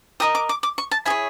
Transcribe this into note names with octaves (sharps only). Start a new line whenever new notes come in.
G4 A#4 D#5 D#6
D6
D6
D6
C#6
A5
E4 G#4 C#5 G#5